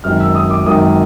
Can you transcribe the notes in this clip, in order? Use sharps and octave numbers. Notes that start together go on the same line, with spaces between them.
G#1 F#2 D#3 F#3 F6
E6
D#6
D6
G#1 F#2 D#3 F#3 D#6